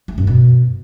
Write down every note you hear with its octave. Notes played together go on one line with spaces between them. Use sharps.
A3
F#2
B2